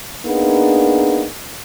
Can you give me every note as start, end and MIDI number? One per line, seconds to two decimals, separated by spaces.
0.26 1.27 58
0.26 1.27 59
0.26 1.27 62
0.26 1.27 63
0.26 1.27 68